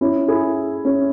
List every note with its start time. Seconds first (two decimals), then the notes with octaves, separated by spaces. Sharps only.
0.01 C#4 E4
0.28 E4 G#4
0.85 C#4